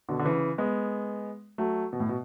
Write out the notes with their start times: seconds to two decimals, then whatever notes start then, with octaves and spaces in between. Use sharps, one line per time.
0.09 B2 D3
0.19 D3
0.25 C#3 E3
0.58 G#3 B3
1.58 F#3 A3
1.93 B2
2.00 A2
2.09 B2